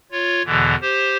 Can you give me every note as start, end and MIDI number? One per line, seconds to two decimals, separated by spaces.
0.12 0.42 65
0.12 0.42 73
0.45 0.75 40
0.45 0.75 47
0.45 0.75 50
0.45 0.75 52
0.82 1.17 67
0.82 1.17 72